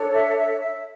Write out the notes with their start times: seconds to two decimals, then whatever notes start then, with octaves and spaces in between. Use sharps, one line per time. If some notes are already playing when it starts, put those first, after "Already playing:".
Already playing: D4 A4 C#5
0.13 E5
0.37 E5
0.61 E5